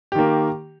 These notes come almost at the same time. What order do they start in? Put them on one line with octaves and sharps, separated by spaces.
G4 D#3 A#3